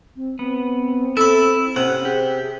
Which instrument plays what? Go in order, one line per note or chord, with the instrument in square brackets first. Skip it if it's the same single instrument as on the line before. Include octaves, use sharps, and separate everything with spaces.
[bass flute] C4
[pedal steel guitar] B3 [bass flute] C4
[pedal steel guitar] E4 E5 [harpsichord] A4 B5
[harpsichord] C3 [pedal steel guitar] C#4 F#5
[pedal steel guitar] G4 [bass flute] G#4